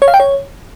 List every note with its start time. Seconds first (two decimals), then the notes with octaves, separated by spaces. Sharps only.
0.02 C#5
0.08 F5
0.14 G5
0.20 C#5